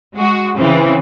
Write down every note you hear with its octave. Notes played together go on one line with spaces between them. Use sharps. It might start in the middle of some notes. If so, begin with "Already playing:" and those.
G#3 F#4
C#3 E3 C4